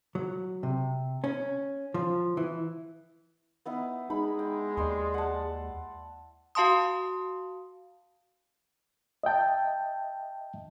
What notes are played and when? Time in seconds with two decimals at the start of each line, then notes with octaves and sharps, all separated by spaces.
0.15 F#3
0.63 C3
1.24 C#4
1.94 F3
2.37 E3
3.66 B3 D#4 E4
4.10 G#3 D#4 B5
4.39 G5
4.77 D#2 D5 G5 C6
5.14 F#5 A5
6.55 F#4 F5 A5 C6 D#6
9.23 D#5 E5 G5 A5